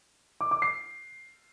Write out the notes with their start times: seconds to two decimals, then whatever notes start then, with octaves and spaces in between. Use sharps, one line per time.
0.41 D6
0.51 D6
0.62 C7